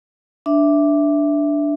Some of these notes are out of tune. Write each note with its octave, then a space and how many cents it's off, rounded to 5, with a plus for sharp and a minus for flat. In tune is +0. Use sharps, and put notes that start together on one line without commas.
D4 +0 E5 +0